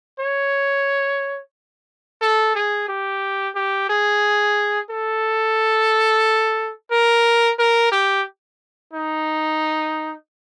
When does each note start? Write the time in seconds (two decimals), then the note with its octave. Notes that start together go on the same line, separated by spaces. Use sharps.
0.20 C#5
2.22 A4
2.55 G#4
2.89 G4
3.55 G4
3.90 G#4
4.90 A4
6.91 A#4
7.59 A#4
7.92 G4
8.93 D#4